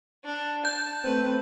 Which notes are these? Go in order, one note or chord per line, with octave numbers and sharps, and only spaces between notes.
D4
A5 G6
A3 C4 B4